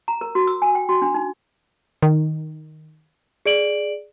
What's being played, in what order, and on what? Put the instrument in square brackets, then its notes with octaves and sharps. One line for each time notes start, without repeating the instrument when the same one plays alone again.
[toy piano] A#5
A#4
F#4
E6
G#5
G5
F#4
D4
D#4
[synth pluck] D#3
[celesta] G#4 D5 D7 F#7